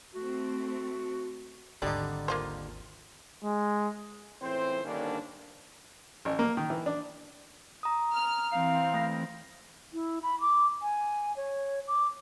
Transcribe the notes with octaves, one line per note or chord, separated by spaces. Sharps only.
A3 C4 F#4
G#1 D#2 D3 G3 D#4 D5
A#3 F4 C5
G#3
C#2 A2 E3 C4 C5
G2 D3 D#3 A#3 C#4 D4
A1
A#3
D#3
E3
D4
A#5 D#6
F6
E3 C4 F5
A3 A#6
E4
B5
D6
G#5
C#5
D6